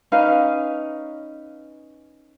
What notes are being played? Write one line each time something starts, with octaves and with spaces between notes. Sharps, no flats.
C#4 D#4 B4 F5